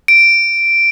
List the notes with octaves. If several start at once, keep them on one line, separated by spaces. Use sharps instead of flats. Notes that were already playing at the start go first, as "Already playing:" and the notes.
D7